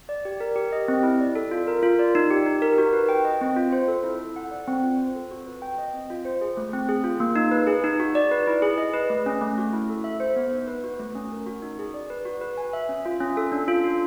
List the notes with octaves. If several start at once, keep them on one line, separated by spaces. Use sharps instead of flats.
D5
G4
A#4
G4
D#5
C4
E4
D5
A4
F4
A#4
F4
D5
D#4
G4
D#4
A#4
F#4
B4
G5
D#5
C4
F4
C5
A4
E4
A4
F#5
D5
C4
F4
C5
A4
F#4
B4
G5
D#5
C4
F4
C5
G#4
A3
C4
G#4
F4
A#3
D#4
B4
G#4
D#4
F#4
D5
B4
E4
G#4
D#5
B4
A3
C#4
A3
F#4
E4
A4
E5
C5
B3
D#4
B4
F#4
A3
C#4
A#4
F#4
D#4
G#4
D5
B4
F#4
B4
G#5
E5
C#4
F4
C#4
A4
D4
F4
D4